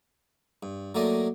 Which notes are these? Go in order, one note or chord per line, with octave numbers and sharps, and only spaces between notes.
G2
F#3 A3 A#3 D5 D#5